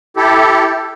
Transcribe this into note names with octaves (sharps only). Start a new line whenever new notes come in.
E4 G4 A4